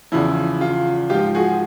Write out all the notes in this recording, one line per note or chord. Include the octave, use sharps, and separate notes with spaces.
E2 C#3 F3 E4
F4
G#2 F3 F4 G4
F#4 G#4